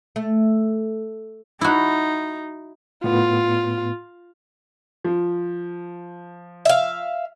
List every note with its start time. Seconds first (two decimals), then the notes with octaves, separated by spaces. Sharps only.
0.16 A3
1.61 D#4 E4 F#4
3.04 A2 B3 F4
5.04 F3
6.65 E5 F5